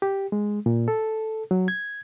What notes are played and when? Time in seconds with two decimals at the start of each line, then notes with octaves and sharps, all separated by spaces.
0.02 G4
0.32 G#3
0.66 A#2
0.88 A4
1.51 F#3
1.68 G#6